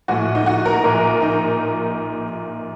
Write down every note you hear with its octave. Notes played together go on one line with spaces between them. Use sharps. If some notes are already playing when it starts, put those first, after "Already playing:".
A#1 A2 F#4
D#4
F#4
A#4
A#1 A#2 A#4
D#4